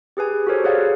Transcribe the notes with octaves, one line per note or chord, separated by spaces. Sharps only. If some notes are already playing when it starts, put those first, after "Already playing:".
G4 G#4 B4 G#5
F#4 G4 A4 A#4 C5 C#5
G#4 B4 C#5 D5 F5 F#5